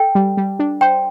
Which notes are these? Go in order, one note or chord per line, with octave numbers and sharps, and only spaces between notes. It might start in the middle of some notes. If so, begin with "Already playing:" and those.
Already playing: A4 G5
G3
G3
D4
C5 G5